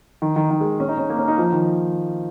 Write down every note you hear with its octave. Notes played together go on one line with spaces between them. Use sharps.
D#3
D#3
D#3
G#3
C#4
D#4
C#4
A#3
C#4
D#4
F3
D#3